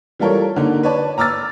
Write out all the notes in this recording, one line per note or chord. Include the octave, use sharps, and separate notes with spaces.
E3 G3 F4 A4 A#4 C#5
D3 A#3 D#4
B4 C#5 D5 A5
A#5 D6 E6 F6 A6